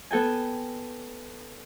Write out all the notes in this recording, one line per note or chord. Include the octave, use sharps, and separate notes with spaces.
B3 A4 G5 G#5